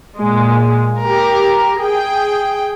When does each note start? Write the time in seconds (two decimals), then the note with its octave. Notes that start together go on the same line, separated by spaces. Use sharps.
0.19 A#2 G#3
1.04 G4 A#4
1.79 G#4 G5